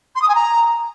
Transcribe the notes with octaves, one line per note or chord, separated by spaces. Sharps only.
C6
D#6
G#5
A#5